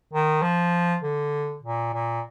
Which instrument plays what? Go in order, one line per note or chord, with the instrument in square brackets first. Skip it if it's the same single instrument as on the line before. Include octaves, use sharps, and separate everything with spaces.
[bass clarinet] D#3
F3
D3
A#2
A#2